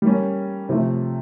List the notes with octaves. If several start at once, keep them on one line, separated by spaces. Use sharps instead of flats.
G3 A#3 C#4
C3 F3 A3